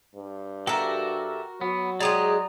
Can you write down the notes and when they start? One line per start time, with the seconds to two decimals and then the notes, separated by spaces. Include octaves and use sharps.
0.15 G2
0.67 F#4 G4 A4 A#4 E5
1.61 F#3 B3
2.00 G#3 G4 G#4 D5 A#5 D#6